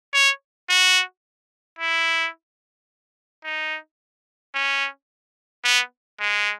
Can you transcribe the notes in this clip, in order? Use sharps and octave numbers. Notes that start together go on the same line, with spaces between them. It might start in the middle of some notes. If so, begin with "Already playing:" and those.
C#5
F#4
E4
D#4
C#4
B3
G#3